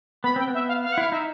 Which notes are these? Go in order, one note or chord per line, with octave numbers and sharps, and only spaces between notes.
B3 B5
C4 G5
B3
E5
F5
F5
F#5
E4 F5
D#4 E5